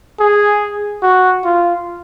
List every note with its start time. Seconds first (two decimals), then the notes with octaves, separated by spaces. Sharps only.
0.20 G#4
1.02 F#4
1.45 F4